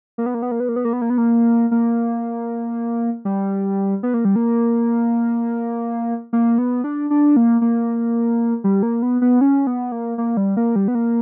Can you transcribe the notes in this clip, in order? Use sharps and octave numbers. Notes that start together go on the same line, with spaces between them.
A#3
B3
A#3
B3
A#3
B3
A#3
B3
A#3
B3
A#3
B3
A#3
A#3
G3
B3
A#3
G3
A#3
A#3
B3
D4
D4
A#3
A#3
G3
A#3
B3
B3
C#4
B3
A#3
A#3
G3
A#3
G3
B3
A#3